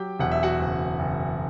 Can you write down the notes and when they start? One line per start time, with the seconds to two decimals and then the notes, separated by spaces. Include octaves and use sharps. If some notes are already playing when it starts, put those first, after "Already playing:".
Already playing: F#3 G4 G5
0.19 E1 F#5
0.32 E5
0.43 F#4 F#5
0.60 F#1
0.99 F#1